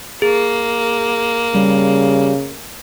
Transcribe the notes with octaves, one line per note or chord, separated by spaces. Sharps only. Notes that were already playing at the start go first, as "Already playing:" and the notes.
A#3 G#4
C#3 G3